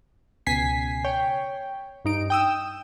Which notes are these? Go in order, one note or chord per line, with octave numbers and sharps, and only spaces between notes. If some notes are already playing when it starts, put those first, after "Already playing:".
C#2 B2 G#5 B6 C7
C#5 G5
G2 D#4 D7
G5 D#6 E6